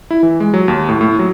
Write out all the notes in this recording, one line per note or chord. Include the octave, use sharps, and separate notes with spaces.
E4
E3
G#3
F#3
D#2
A2
A2
F#3